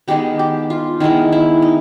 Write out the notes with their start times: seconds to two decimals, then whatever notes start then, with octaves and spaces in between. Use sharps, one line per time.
0.08 D#3 G#3 B3 G4
0.39 G4
0.70 F4
1.00 D#3 G#3 B3 E4
1.32 E4
1.62 D#4